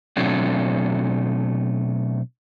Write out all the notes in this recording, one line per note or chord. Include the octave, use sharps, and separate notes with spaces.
B2 F#3 A3 C4 D4